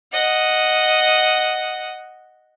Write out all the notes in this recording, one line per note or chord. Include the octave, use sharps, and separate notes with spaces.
D#5 F#5